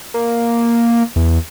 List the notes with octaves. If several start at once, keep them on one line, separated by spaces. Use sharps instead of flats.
A#3
E2